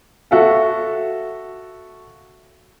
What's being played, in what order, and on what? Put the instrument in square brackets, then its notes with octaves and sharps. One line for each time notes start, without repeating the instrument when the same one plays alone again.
[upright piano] F#4 A4 E5 F5